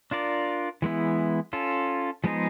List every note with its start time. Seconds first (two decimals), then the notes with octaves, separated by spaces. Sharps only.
0.11 D4 F4 A#4 D5
0.82 E3 G#3 B3 E4
1.53 C#4 F4 A4
2.24 F3 G#3 B3 D#4 G#4